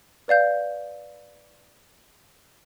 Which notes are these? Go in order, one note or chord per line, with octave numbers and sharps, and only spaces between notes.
B4 D5 F5 G6